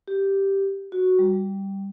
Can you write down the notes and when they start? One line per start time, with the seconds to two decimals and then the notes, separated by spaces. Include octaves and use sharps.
0.08 G4
0.92 F#4
1.19 G3